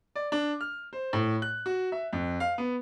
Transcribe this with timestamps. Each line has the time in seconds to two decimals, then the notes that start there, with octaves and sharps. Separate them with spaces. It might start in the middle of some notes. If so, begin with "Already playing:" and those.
0.16 D5
0.32 D4
0.61 F6
0.93 C5
1.13 A2
1.42 F#6
1.66 F#4
1.92 E5
2.13 F2
2.40 F5
2.58 B3